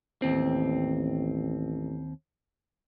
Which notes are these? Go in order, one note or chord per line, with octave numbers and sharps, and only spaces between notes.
A1 D#2 C4